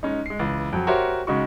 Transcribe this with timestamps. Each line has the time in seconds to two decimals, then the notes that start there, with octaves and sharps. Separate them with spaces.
0.03 G#3 C#4 D#4
0.26 G#3 C7
0.39 C#2 E3
0.73 F2 F#3
0.87 F#4 G4 A#4 C5 C#5 E5
1.27 C#3 G#3 D#4 F#4 C#6